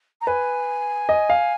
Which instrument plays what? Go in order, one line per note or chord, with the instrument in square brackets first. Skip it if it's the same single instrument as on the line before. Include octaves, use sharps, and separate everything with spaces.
[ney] A#5
[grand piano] B4 [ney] G#5
[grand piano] D#5
F5